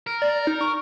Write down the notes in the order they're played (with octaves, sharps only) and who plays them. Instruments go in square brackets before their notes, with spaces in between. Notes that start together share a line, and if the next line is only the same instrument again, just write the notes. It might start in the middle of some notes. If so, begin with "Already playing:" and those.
[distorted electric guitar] A#4
[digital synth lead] D5
D#4
C#6